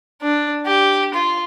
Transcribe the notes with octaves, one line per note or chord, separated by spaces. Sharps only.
D4
G4
F4